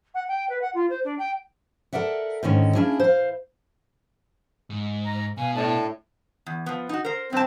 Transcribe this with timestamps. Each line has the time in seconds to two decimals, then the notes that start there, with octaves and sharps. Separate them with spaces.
0.14 F#5
0.28 G5
0.49 B4
0.61 F#5
0.74 F4
0.89 C5
1.04 D4
1.18 G5
1.93 A4 A#4 D5 E5 F#5
2.43 G#2 D3 D#3 C#4
2.75 A#3 C#4 D4 E4 G#4
3.00 C5 F5
4.70 G#2
5.05 A#5
5.38 B2 F5 G#5
5.55 A2 D4 A5
6.46 E2
6.66 F3 B3
6.89 D#4 F#4
7.05 A#4 C5
7.33 G2 C4 A5